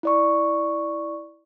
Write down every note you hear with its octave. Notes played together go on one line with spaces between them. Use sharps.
E4 D5 C#6